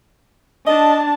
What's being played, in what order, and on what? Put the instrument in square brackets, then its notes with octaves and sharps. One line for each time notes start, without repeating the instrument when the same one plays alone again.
[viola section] D4 A5 [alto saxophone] D#5